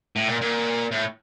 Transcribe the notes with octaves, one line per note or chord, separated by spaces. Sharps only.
A2
A#2
A#2
A2